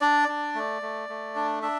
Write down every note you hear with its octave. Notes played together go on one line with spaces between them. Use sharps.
D4 D5
D4
A3
A3
A3
D4
D4 E5